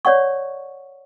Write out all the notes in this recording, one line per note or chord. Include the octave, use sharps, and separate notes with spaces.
C#5 D5 F#5 C#6